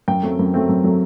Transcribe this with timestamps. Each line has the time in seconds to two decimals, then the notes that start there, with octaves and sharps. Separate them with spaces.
0.08 F#2 G5
0.23 F#3 A3 C4
0.39 F#2
0.54 F#3 A3 C4
0.69 F#2
0.84 F#3 A3 C4